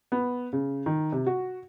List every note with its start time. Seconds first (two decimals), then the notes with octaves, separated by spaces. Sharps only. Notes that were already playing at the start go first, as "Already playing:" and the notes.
0.12 B3
0.53 C#3
0.86 D#3
1.12 C3
1.26 F#4